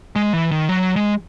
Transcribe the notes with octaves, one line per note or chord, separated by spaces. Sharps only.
G#3
E3
D#3
F#3
G#3